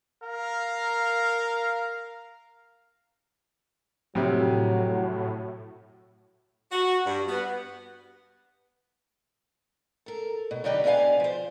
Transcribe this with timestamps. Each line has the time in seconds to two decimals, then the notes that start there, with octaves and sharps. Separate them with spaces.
0.24 A#4 F5
4.15 F2 A2 C3 F#3
6.71 F#4
7.06 G2
7.28 B3
10.06 A4 A#4
10.51 B2
10.64 D3 F#3 D4 D#4 G4 B4
10.84 B2 B3 D4 G#4 F5 G#5
11.20 F3 C5